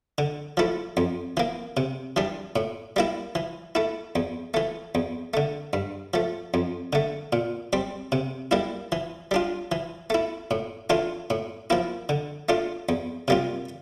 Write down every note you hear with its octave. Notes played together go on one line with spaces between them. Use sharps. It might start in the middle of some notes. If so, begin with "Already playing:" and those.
D3
F3 A3 E4
F2
E3 A#3
C3
E3 G3 D4
A2
G3 A#3 E4
E3
A3 E4
E2
E3 A3
E2
D3 A3
G2
F3 A3
F2
D3 A3
A#2
G3 C4
C3
G3 A#3 E4
E3
G3 D4 F4
E3
A3 E4
A2
E3 A3 D4 F4
A2
F3 A#3 E4
D3
A3 D4 F4
E2
C3 G3 A#3 F4